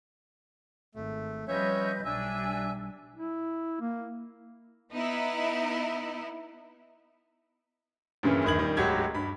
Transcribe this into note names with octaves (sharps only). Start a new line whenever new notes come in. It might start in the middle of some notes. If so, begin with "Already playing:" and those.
G#1 A3
F3 G3 C#4 B4 C#5 D#5 E5 G6
B1 G3 D4 E5 G#5 E6
E4
A#3
B3 D#4 E4
G2 A#2 C#3 E3 C#4
A#1 E2 D#3 G#6 F#7
A#2 D#3 G3
D1 G#2 F#3 F#4 G4 G#6
G2 B5